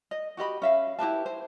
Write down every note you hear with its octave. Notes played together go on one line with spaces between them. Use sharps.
D#5
F#4 G4 D#5 B5
C#4 E5 F5
E4 G4 B4 A5
C5